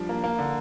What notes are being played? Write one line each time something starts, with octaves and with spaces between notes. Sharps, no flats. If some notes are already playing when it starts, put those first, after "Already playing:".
Already playing: F3 G3 D4
A#3
A#3
D3